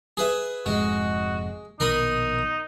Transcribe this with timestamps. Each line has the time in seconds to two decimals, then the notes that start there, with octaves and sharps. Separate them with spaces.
0.17 G#4 B4 E5
0.66 F1 F2 G#2 G#3 F#4
1.80 A#1 B2 D#3 D#4 A#4 B5 D#6